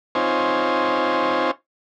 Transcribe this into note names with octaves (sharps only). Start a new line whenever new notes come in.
C4 D#4 F4 C5 C#5 G#5